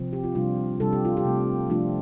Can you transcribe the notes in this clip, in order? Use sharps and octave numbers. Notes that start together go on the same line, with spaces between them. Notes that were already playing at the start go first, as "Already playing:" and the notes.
Already playing: C3 F3 C4
G4
F4
C3 G3 D4 F4
C3 G3 D4 A4
G4
F4
G4
C3 A3 C4
F3 A3 D4 F4